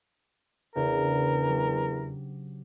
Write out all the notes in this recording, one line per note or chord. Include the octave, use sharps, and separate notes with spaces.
E2 C#3 D4 A#4 C5
F#3 G4